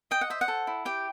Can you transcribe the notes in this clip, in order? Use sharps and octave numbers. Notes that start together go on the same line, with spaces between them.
D#5 G5
F#5
C5 E5
F#5
A4
E4
G4 G5